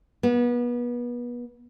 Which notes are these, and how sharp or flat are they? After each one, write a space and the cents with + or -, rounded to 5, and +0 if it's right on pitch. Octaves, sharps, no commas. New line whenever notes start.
B3 -30